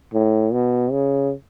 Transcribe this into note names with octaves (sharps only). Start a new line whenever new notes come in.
A2
B2
C#3